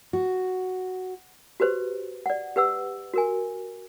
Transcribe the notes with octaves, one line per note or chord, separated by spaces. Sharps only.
F#4
F#4 G4 B4 C5
D5 F#5
G4 B4 F#5 E6
F#4 A#4 G#5